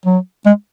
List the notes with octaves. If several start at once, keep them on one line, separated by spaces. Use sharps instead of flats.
F#3
G#3